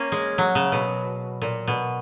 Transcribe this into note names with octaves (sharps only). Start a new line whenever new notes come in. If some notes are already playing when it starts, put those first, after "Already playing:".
Already playing: A#3 C#4
G#3
F#3
C#3
B2
A#2
B2